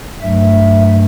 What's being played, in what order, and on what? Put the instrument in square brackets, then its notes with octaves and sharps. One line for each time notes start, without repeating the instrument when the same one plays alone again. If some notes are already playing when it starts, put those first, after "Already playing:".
[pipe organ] G2 F#3 A3 E5